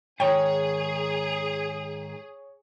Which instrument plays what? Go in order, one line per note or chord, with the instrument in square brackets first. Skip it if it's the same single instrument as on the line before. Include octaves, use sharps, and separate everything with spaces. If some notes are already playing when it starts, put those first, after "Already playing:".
[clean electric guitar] G#2 D#3 [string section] G#4 [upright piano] C#5 [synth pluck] G5